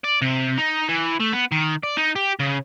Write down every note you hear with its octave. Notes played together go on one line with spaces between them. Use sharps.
D5
C3
D#4
E3
A3
B3
D#3
D5
D#4
G4
C#3